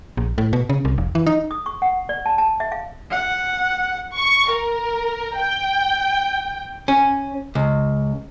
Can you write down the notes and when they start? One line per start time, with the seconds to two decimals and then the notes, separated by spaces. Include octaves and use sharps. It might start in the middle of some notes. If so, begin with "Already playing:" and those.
0.17 A#1
0.38 A2
0.53 B2
0.69 C#3
0.85 C2
0.98 F1
1.15 E3
1.27 D#4
1.51 D#6
1.66 C#6
1.82 F#5
2.09 D5
2.26 A5
2.38 A5
2.60 E5
2.72 F5
3.11 F#5
4.16 C#6
4.50 A#4
5.37 G5
6.88 C#4
7.55 C#2